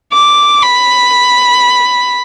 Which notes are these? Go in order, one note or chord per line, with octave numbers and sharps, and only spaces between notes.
D6
B5